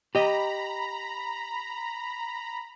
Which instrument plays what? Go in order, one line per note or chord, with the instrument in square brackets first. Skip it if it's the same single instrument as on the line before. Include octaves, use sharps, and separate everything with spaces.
[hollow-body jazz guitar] G4 D#5 [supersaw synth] A#5 B5